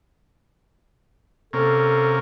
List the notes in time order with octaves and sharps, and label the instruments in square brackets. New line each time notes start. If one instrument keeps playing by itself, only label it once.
[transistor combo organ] C3 A#3 C#4 [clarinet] A4